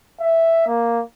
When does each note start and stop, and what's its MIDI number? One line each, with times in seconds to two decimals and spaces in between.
0.21 0.64 76
0.66 1.01 58